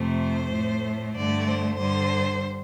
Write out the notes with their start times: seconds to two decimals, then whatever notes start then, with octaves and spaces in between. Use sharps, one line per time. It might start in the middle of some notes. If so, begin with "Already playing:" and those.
Already playing: F2 C3 A3 C5
0.53 A2 A3
1.15 G2 D3 A3 D5
1.46 C5
1.77 G2 D3 G3 C5